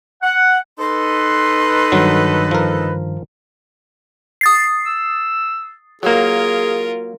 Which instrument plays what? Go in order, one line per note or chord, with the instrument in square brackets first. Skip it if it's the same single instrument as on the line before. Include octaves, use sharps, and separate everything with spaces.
[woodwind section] F#5
[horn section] D#4 A4 B4 [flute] C6
[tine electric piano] G2 D#3 [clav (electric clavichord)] F#3
[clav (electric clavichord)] F3 A#4
[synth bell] D#6 A6 C7
[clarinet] E6
[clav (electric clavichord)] F#3 A#3 [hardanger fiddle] F4 A#4 [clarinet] G#4